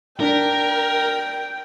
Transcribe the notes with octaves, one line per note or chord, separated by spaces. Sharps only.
D4 A#4 G5 B6